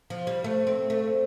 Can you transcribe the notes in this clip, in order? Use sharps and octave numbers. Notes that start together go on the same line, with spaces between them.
F3
G3
A3
C4
A3